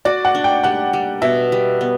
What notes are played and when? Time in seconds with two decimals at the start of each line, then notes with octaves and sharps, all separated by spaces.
0.05 F#4 D5
0.25 F#5
0.35 D4
0.44 G5
0.63 G3 F#5
0.93 G3
1.22 B2 E5
1.52 G3
1.81 B3